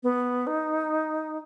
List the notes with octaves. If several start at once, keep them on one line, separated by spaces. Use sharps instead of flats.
B3
D#4